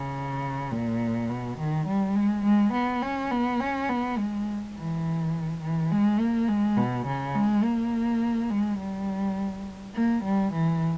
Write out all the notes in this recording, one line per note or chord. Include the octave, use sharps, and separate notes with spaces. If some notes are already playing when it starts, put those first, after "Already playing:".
Already playing: C#3
A#2
B2
D#3
G3
G#3
G#3
B3
C#4
B3
C#4
B3
G#3
E3
E3
G#3
A#3
G#3
B2
C#3
G#3
A#3
G#3
G3
A#3
G3
E3